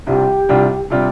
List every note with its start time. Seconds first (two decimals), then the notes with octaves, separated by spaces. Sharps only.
0.07 C2 C3 G3 D4 F4 G4
0.49 C2 C3 G3 D4 F4
0.90 C3 G3 D4 F4